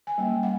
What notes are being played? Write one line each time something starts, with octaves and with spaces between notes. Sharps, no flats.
G#5
G3 A#3 C#4 G5
F#5